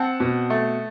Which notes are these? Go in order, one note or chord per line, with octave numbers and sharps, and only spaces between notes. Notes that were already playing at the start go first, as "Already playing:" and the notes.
Already playing: C4 F#5 A5
B2
A3